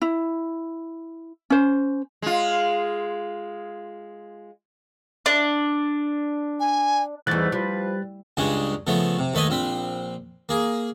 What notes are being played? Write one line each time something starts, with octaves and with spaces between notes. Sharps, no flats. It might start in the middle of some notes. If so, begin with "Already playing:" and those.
E4
C#4 C5
G#3 F4
D4
G#5
E2 G#2 E3 G3 A3 F#6 A6
F3 G3 F4 B4
C#2 G2 C#3 G#3 C#4
C#3 F3 A3 B3
C3
D#2 A3 B4 D#5 G#5
A#1 C4 B5
A#3 G#4